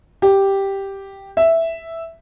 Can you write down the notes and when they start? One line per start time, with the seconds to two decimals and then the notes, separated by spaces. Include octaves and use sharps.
0.22 G4
1.37 E5